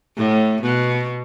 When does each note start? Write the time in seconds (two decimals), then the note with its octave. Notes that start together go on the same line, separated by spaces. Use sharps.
0.17 A2
0.62 B2